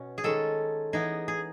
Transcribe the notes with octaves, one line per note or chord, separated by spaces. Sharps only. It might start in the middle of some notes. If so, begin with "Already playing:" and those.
Already playing: B2 C#4
G#4
D#3 G#3 C#4 A4
E3 B3 D#4 G#4
G#4